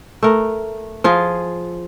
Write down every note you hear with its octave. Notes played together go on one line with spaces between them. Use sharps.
A3 A#4
F3 F4 G#4